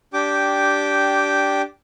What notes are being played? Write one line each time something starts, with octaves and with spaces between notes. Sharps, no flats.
D4 G4 G5 D6